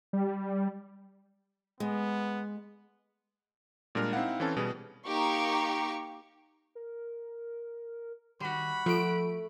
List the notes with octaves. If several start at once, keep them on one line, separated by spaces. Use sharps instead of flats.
G3
G#3 B3
A#2 G3 G#3 D4 A#4 F6
C4 D#4 E4 F5 F#5
E3 C4 C#4 A4 A5
B2 G3 B3 G#4
A#3 D#4 G4 C#6
A#4
D#3 G3 F#4 F#5 B5
F3 A3 A4 D7